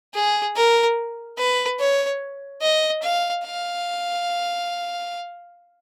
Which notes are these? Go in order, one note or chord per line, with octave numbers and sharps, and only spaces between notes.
G#4
A#4
B4
C#5
D#5
F5
F5